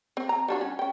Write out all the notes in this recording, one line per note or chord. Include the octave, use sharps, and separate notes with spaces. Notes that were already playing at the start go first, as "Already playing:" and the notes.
C4
A#5
G3 D4 F#4
C#4
C#4 G5